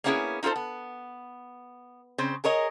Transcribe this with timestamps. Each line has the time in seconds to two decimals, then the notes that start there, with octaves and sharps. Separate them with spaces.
0.04 A#3 B3 C#4 E4 F4 G#4
0.43 D#4 F4 G4 A4 C5
0.56 B3
2.18 C#3 C4 C5
2.44 G#4 A#4 C#5 D#5